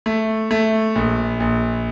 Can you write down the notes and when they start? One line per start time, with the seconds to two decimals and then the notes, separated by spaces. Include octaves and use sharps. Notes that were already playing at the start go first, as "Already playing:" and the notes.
0.06 A3
0.51 A3
0.96 A#1
1.40 A#1